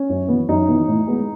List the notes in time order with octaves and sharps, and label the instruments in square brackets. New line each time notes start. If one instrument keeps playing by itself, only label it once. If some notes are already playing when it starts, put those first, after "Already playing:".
Already playing: [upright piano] C#4
F#2
E3 B3
F#2 D#4
E3 B3
A2
G#3 B3